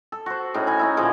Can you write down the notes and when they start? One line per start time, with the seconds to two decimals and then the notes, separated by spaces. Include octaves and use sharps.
0.12 A4
0.26 F#4 C5
0.54 A2 C#4 D#4
0.67 E4 G#5
0.79 C#4 D#4 E4
0.97 A#2 D3 F3 D4